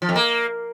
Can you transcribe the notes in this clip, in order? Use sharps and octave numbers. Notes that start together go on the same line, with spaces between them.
F3
F2
A#3